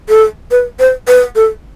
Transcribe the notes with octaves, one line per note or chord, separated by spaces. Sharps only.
A4
B4
C5
B4
A4